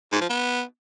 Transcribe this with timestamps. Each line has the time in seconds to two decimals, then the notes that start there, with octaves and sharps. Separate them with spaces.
0.12 G#2
0.21 F3
0.30 B3